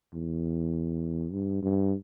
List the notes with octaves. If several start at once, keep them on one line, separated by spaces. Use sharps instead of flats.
E2
G2
G2